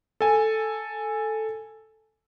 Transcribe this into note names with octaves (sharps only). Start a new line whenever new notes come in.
A4 G#5